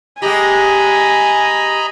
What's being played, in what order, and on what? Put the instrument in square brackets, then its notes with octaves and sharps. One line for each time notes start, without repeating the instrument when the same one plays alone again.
[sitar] G#3 G4 [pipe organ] D#5 A#5 B5 [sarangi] G#5